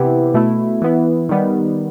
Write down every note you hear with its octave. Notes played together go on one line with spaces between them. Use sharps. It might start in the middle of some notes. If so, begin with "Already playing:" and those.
Already playing: C3 E3 B3 E4 G4
B2 A3 E4
E3 B3 E4
D#3 G3 B3